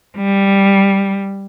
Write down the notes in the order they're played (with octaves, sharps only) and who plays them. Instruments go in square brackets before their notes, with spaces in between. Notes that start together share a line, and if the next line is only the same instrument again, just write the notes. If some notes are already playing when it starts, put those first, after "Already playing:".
[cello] G3